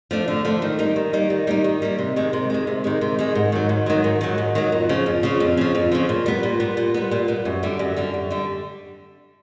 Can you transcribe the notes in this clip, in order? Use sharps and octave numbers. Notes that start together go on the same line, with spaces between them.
F3 A3 D4
D3
F3 A3 D4
D#3
G3 A#3 D#4
D#3
G3 A#3 D#4
D#3
G3 A#3 D#4
D#3
G3 A#3 D#4
C3
D#3 G#3
C3
D#3 G#3
C3
D#3 G#3
C3
D#3 G#3
G#2
D#3 F#3
G#2
D#3 F#3
G#2
D#3 F#3
G#2
D#3 F#3
F2
C#3 F3
F2
C#3 F3
F2
C#3 F3
F2
C#3 F3
A#2
G3 B3
A#2
G3 B3
A#2
G3 B3
A#2
G3 B3
F#2
D3 G3
F#2
D3 G3
F#2
D3 G3